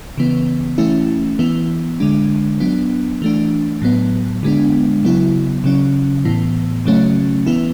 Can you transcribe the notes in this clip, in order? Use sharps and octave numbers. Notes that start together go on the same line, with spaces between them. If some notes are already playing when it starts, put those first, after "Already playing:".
C#3 E3 B3
E3 A3 C#4 E4
E3 B3 E4
D3 G#3 D4
F#3 B3 D4
E3 A3 D4
A2 F#3 B3
D3 G#3 B3 D4
C#3 F#3 B3 E4
C#3 F#3 C#4
A2 E3 B3
C#3 F#3 A3 C#4
E3 B3 E4